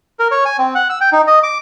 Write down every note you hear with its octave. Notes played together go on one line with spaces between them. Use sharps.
A#4
C#5
G#5
C4
F#5
E6
G5
D#4
D#5
D6